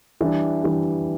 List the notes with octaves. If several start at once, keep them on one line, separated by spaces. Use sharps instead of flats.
E3 G3 D4
E3 G3 D4